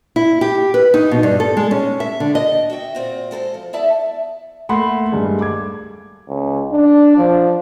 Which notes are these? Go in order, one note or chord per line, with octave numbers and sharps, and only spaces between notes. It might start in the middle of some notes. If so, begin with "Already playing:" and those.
E4
G4
B4
D#4
B2
G2
A4
G#3
C#4
E5
D3
D#5
F#4 E5 G5
A#2 C4 F#4
G#3 A4 B4 C5
F3
B3 E4 A4 D5 E5 A5
A3 A#3 F#5 B5 C6
G2 G#3
D6 G#6
C#2
D4
F3